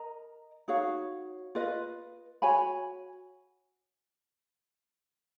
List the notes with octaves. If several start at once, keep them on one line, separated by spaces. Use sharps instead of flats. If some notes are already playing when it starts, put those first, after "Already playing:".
Already playing: A#4 D#5 A#5
D#4 F#4 C#5 F5
F4 B4 D#5
F#4 C#5 G#5 B5